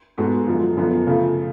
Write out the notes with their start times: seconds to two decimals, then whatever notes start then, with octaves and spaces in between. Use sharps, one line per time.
0.17 G#2 G#3 B3 F#4 A4
0.47 F#2 D3 F3
0.77 F#2 D3 F3 B3
1.07 C#3 F3 A3